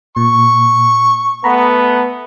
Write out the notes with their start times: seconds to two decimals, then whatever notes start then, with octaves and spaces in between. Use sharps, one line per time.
0.17 A#2 C#6
1.44 A3 B3 A#5 B5